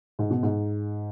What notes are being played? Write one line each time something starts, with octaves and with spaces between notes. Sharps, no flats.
G#2
B2
G#2